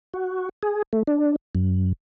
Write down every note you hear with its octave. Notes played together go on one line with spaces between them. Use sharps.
F#4
G#4
A3
D4
F#2